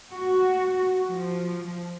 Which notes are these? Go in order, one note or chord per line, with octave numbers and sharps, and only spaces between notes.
F#4
F3